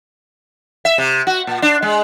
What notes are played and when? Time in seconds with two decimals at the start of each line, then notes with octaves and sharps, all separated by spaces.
0.85 E5
0.98 C3
1.27 F#4
1.47 A#2
1.62 D4
1.82 G#3